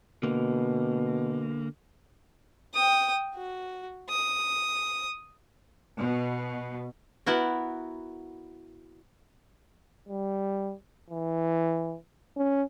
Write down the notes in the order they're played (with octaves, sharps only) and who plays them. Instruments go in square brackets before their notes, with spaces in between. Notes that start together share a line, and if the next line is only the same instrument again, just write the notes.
[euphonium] B2 [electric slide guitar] D3 A#3
[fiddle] G5 D#6
F#4
D#6
[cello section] B2
[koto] B3 E4 F#4 A#4
[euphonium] G3
E3
C#4